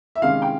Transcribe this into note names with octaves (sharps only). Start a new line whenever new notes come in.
E5
C3 D#3 G#3 C#4 F5
G5